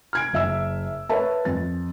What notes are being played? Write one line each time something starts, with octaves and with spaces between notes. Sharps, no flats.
F6 G#6 D7
F#1 E5 E6
A#4 B4 C#5 E5 A5
F2 A6